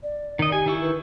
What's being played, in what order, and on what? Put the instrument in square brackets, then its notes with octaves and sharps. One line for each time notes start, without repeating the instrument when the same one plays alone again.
[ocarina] D5
[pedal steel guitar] D#3 D#5
[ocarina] G4 [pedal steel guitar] G#5
[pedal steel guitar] D#3 E4 C#6
[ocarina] B4